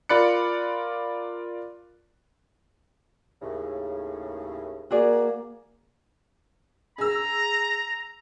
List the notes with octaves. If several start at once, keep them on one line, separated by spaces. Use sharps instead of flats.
F4 A#4 D5 B5 F#6 C#7
D#2 A2 C#3
A#3 F#4 G#4 D5
G#4 A#5 E6